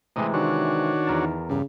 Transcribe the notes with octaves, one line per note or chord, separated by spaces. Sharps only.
A2 C3 E3 G#3 D#5
D#3 D4 F#4 C#5
E2 A#4 A5
G2 C#3